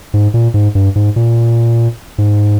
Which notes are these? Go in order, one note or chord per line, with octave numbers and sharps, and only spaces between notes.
G#2
A#2
G#2
G2
G#2
A#2
G#2